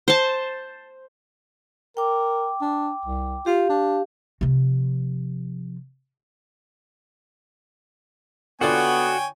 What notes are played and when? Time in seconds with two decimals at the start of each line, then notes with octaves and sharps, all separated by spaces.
0.08 C5 A5
1.97 A#4 G5 D6
2.61 D4
3.05 C2
3.46 F4 G4 F5
3.69 D4
4.41 C3 F3
8.61 D3 B3 F4 F#4 C#5 D5 G5 G#5